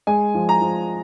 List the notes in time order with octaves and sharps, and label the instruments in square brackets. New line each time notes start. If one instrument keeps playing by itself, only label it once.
[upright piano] G#3 G#5
F3
A#5
F3